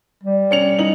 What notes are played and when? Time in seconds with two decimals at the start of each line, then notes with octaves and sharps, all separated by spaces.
0.23 G3
0.51 C#4 C#7 F7
0.79 D#4 F#7